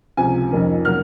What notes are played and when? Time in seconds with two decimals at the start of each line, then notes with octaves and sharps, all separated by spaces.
0.17 C#2 C3 F3 G#5
0.51 F2 D#3 A#3 C#4
0.85 C#3 F#3 A#3 F6